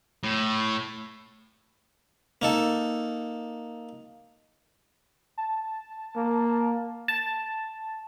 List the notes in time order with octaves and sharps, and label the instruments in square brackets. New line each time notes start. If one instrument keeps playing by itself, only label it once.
[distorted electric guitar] A2
[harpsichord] A#3 D#4 A4
[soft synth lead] A5
[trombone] A#3
[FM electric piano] A5